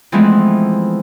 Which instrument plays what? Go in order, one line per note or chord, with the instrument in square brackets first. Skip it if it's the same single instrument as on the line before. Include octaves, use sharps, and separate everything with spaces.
[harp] E3 F3 G#3 A3 B3 C4